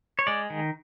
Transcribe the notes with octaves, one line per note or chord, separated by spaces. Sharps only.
C#5
G#3 D5
D#3